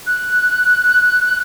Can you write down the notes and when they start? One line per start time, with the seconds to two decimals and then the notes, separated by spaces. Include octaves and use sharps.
0.06 F#6